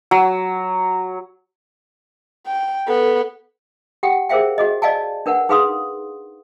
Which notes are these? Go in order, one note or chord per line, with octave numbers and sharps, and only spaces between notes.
F#3
G5
B3 A4
G4 F#5 G5
G#4 A#4 C5 E5 F5 G5
F#4 G#4 D#5
D5 D#5 F5 G#5 A5
D4 A#4 B4 F#5
D#4 G#4 B4 F5 C6 D#6